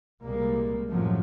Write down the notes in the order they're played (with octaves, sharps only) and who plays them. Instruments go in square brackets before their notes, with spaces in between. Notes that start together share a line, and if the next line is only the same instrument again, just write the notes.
[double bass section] C2 A#2 G3 G#3 A#3
F#2 A2 C3 F3 F#3